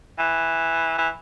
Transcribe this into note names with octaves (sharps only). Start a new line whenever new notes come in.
E3
E3